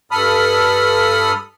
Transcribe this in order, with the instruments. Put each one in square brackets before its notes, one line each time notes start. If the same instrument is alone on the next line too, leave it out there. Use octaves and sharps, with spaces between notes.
[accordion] G2 A4 B5 D#6 F6